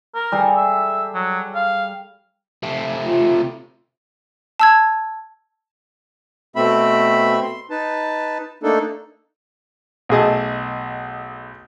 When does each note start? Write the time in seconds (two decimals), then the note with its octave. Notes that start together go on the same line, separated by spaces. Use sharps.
0.15 A#4
0.32 G3 G#4 A4
0.56 E5
1.15 F#3
1.55 F5
2.63 C3 A3
3.04 F4
4.60 A5 E6 G#6
6.56 B2 A3 C4 E5 B5
7.42 C6
7.70 D#4 B4 A5
8.63 A3 A#3 D4 D#4 A4
10.09 B1 A3 G#4 D#5 A5